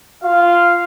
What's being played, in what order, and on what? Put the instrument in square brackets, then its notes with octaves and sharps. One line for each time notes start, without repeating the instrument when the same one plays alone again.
[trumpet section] F4 F5